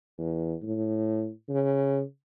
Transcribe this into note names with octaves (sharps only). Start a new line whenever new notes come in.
E2
A2
C#3